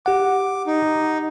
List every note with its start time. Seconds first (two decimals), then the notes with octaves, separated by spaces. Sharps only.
0.06 G4 F#5 D6
0.67 D#4